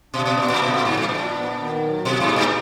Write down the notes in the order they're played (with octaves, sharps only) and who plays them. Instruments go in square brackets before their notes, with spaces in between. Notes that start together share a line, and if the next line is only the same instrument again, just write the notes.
[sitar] B2 [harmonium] D4
[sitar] B2
[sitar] A#2 [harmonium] B3
[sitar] A#2
[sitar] B2 [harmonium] D3
[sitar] A#2
[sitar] G#2 [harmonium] F3
[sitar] A#2
[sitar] A#2 [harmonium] D4
[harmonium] B3
D#3
F#3
[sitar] B2 [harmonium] G#4
[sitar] G#2
[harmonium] D#4
[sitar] A#2